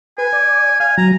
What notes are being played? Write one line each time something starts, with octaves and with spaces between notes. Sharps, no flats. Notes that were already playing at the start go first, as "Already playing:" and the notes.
B4 G#5
D5
F5 G#5
F#3 A#5